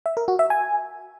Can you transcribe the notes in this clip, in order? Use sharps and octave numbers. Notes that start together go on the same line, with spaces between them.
E5
A#4
F#4
E5
G#5